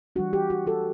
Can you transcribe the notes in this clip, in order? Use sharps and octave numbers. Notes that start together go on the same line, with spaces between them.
E3 G3 D4 F#4
G4
F#4
F#4 A4